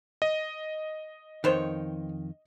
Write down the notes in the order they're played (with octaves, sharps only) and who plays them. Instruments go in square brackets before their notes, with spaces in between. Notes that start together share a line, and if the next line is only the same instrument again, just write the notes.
[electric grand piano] D#5
[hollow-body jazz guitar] F2 D#3 [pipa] B3 C5 C#5